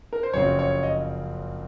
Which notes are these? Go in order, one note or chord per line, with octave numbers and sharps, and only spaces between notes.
A#4
C5
F#1 F2 C#3 F#3 C4 C#5
C#5
D#5